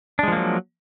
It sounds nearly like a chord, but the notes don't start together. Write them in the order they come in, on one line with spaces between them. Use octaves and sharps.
D4 G#3 F3 A#3 F#3